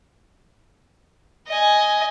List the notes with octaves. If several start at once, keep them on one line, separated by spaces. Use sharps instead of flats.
D#5 G#5